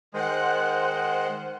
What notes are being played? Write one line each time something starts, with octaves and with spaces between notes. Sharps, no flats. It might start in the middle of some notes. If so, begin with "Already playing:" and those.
D#3 G#3 C5 F#5 F#6